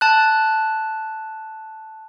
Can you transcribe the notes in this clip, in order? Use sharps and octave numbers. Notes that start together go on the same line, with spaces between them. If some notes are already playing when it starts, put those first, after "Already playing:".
A5 F#6